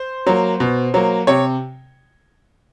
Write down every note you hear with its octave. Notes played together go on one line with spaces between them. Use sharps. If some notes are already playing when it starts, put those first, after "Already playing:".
Already playing: C5
F#3 A#3
B2
F#3 A#3
C3 C#5